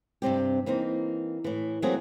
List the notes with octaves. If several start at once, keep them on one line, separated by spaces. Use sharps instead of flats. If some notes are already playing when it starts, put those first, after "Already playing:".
G2 C3 C4 G4
E3 A#3 C4 D#4
A2 E3
E3 F#3 A3 A#3 C4 G#4